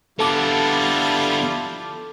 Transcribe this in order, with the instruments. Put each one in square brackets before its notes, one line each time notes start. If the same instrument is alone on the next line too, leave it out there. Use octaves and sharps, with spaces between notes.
[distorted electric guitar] D3 B3 [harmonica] G3 E4 F4 [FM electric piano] A4 A5 D6